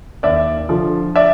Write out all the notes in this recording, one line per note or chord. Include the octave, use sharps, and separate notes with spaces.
D#2 D5 E5
D3 F3
D5 E5